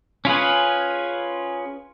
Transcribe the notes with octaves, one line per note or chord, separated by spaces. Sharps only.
C#4 F4 G#4 B4